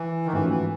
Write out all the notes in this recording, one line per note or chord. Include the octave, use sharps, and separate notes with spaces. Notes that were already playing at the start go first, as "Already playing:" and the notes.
Already playing: E3
D#3
G#2 E3 F3 A3 C#4 F#4
E3